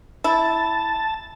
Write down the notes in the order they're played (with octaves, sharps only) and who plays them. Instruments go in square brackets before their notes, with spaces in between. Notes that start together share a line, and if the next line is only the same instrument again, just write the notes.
[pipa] E4 [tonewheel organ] A5